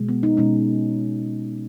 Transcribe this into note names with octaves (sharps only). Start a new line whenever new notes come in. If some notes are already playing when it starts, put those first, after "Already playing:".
Already playing: B2 G#3
B3
D#4
B2 G#3 C#4